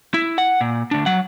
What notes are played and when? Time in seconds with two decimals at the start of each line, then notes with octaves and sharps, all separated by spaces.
0.14 E4
0.38 F#5
0.61 A#2
0.91 D2 D4
1.06 F#3 F#5